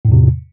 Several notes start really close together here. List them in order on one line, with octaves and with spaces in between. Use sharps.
A2 E2 C3